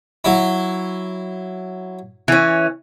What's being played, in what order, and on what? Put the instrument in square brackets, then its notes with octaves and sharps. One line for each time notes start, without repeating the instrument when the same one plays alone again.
[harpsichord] F#3 E4
[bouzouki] E3 C#4